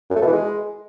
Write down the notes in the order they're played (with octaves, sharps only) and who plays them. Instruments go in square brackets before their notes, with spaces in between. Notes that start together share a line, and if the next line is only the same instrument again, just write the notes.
[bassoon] F#2
A3
B2
E3
G#3